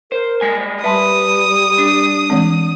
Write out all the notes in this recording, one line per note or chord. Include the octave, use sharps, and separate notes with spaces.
A#4 C5
G3 G#3 G#5
G3 B4 E5 A5 C6 D#6
D4
E3 G#3 C4